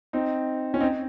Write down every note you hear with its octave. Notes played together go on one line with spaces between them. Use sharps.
C4 D#4
C#4
C4 D#4